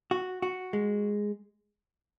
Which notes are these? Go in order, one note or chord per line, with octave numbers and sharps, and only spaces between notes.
F#4
F#4
G#3